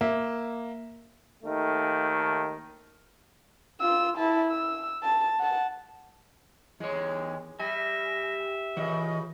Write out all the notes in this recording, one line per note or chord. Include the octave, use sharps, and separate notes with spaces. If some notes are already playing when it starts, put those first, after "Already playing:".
A#3 E5
D#2 D#3 A3
F4 E6
E4 A5
E6
A5
F#5 A5
E2 G#3 C#5
G3 E5 G#5 A#6
A#2 C#3 E3 D#5